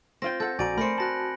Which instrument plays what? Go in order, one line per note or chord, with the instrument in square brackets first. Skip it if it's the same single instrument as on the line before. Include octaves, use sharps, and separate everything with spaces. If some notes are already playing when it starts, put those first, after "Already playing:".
[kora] C4 F4 G5 [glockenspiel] A#6
[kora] A4 F#5 [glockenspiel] G6
[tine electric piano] A#1 F#4 A#5 [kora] D5 [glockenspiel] G#5 D7
[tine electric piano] A3 [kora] C4 A#4 [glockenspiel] B5 A#6 C#7
[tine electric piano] F#4 A5 [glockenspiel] F#6 A#6 F#7